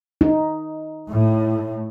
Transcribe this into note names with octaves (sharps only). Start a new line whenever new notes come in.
D#4
A2